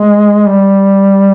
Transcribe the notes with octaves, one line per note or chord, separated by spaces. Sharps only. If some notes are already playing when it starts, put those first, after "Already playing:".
Already playing: G#3
G3